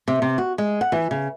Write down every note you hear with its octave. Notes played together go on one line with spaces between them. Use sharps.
C3
C3
F#4
G#3
F#5
E3
C#3